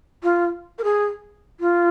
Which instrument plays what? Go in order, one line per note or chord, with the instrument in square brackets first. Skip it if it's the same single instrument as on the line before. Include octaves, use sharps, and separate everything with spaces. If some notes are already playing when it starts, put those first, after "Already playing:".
[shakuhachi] F4
A#4
G#4
F4